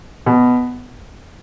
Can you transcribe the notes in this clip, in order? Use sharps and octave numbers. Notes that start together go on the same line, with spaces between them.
B2